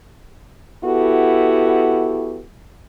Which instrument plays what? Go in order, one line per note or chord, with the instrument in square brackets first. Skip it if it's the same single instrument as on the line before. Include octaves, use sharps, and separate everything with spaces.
[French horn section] B3 E4 F#4 G4 A4